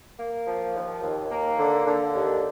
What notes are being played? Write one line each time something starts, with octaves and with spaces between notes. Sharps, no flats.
A#3
F3
D#2
D#2
A#3
D3
D3
D#2